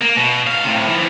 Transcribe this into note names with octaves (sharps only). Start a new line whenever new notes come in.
A#3
B2
G#2 F5
A2 C3
E3 F3